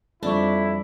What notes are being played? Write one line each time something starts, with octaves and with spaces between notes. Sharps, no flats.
F2 G3 D4 E4 D5 C#6